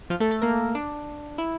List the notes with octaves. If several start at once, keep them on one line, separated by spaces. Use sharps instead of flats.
F3 F4
A3 A4
A3 A4
A#3 A#4
D4
E4